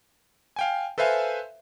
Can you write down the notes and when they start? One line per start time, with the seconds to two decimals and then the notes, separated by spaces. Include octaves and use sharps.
0.56 F5 G5 G#5
0.98 A4 B4 C5 E5 F5 G#5